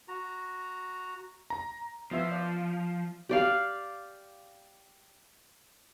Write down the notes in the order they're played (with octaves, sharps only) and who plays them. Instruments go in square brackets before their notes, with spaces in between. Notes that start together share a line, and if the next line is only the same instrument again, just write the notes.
[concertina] F#4 A#5
[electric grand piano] A#5
[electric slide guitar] F3 [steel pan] B3 F4 E5
[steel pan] D5
[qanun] G4 D5 F5